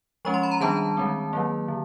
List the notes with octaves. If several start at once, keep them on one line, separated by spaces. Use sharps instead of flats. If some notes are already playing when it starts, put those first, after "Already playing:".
F3 G#3 C#4 C#6
C6
B5
A#5
D#3 G3 B3 D4 A5
D#3 G#3 C4
D#3 F#3 A#3
D3